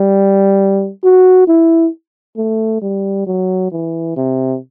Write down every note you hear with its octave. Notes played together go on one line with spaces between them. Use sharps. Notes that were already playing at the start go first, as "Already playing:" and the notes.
Already playing: G3
F#4
E4
A3
G3
F#3
E3
C3